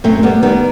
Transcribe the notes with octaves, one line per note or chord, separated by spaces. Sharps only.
F#2 A3 C4
G3 B3
D#3 G3 B3